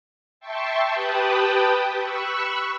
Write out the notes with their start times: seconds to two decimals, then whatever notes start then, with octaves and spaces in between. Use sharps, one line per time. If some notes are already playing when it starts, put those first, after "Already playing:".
0.40 E5 G5 A5 C6 C#6
0.90 G4 B4 G5 A5 B5 D#6
1.95 B5 C#6 E6 F#6